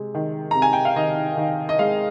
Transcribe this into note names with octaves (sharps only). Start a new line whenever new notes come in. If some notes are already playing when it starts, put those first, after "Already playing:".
Already playing: C3 G#3
D#3
C3 A#5
G#5
G5
F5
D#3 D#5
D#3
D#5
G#3 F5